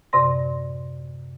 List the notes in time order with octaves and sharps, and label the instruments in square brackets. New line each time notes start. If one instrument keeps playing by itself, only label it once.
[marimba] F#2 A2 C3 D5 C6 A#6